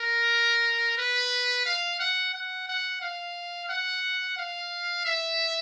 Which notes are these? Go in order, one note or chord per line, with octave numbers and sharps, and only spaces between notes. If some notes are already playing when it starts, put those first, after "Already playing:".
Already playing: A#4
B4
F5
F#5
F#5
F#5
F5
F#5
F5
E5